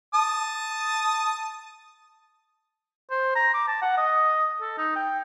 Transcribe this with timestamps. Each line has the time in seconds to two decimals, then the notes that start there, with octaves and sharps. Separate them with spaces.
0.14 A5 D#6
3.11 C5
3.35 A#5
3.54 D6
3.67 A5
3.82 F#5
3.97 D#5
4.61 A4
4.78 D#4
4.96 G5